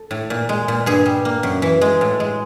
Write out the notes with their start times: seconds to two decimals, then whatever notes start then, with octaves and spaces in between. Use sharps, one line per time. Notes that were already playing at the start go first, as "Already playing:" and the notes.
Already playing: A4
0.11 A2
0.30 A#2
0.49 G#3
0.68 A#2
0.86 G2 G#4
1.06 G3
1.25 A#3
1.43 F#2
1.62 E3
1.81 G#3
2.01 A2
2.20 G#3